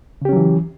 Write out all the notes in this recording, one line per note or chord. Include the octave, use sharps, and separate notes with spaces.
C#3 E3 F#3 C#4 G4